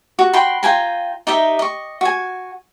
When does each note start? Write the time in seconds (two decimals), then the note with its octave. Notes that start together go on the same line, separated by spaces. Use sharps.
0.19 F#4
0.33 F#4 G5 B5 C6
0.63 F4 G5 G#5 A#5
1.27 D#4 G4 D#5 E5
1.59 D#5 C#6
2.01 F#4 G#5